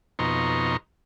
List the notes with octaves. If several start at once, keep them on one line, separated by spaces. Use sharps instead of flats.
F2 B2 D#4 A#5 C6 C#6